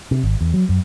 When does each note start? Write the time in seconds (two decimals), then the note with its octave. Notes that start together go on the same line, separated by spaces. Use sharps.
0.11 C3
0.23 G#1
0.41 E2
0.54 F#3
0.69 F#2